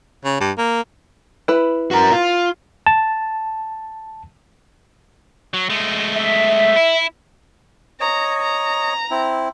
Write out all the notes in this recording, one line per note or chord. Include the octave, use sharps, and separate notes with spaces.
C#3
G2
A#3
E4 B4
F#4 A#4
F4
A5
F#3
G#3 A3
E5
E4
C#5 D#5 A#5
A#5
C4 E4